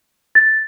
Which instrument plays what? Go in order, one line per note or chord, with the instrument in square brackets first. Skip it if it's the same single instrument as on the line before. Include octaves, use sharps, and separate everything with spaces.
[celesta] A6